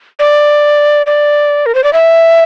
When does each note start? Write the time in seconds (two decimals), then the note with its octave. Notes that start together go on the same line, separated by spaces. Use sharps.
0.19 D5
1.06 D5
1.66 A#4
1.75 C5
1.84 D5
1.93 E5